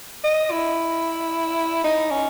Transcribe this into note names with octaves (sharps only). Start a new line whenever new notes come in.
D#5
E4
D#4
C#4